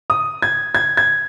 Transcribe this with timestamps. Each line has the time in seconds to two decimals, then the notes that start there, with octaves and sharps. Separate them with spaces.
0.10 D#6
0.42 G#6
0.75 G#6
0.97 G#6